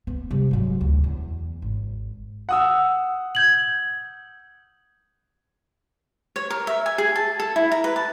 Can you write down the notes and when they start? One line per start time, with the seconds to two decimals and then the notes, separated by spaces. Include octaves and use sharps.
0.07 B3
0.31 C3 G3
0.51 G#2 F#3
0.81 D2
1.04 E2
1.62 G#1
2.49 F#5 D#6 E6
3.35 G6 G#6 F#7
6.36 C#5
6.50 A#4
6.67 E5
6.86 G#5
6.98 G#4
7.16 A5
7.40 A4
7.56 E4
7.72 A#5
7.84 B4
7.96 A5